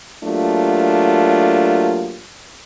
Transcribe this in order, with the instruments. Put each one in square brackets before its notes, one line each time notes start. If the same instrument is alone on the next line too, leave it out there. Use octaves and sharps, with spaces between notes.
[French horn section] F#3 A3 A#3 D4 F4 G4